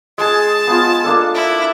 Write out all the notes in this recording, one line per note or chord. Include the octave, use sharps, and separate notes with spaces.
G#3 G#4 A5
B3 F4
A#3 D4 A4
E4